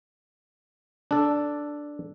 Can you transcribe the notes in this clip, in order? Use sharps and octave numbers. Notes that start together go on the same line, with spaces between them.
D4 A4